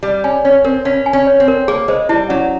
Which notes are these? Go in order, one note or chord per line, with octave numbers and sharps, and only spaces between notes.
G3 F5
C#4 G#5
C#4 C#5
C4 A#4
C#4 F5
G#5
C#4
C#5
C4
A#4
A#3 G#4
G#3 C5
G3 E4
F#3 C#4